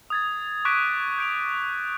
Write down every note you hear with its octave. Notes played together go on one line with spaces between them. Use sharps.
D#6 G#6 A6
C#6 D6 F#6 G#6 B6 D7
G6 D7 F7